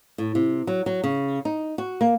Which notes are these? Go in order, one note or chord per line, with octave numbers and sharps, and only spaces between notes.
A2
C3
F#3
F#3
C#3
D#4
F#4
A#3